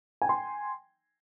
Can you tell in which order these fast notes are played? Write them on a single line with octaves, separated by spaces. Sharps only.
G#5 G5 C6